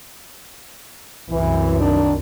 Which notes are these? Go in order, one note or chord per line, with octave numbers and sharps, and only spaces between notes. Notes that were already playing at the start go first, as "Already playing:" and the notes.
C2 F#2 E3
D#3 D4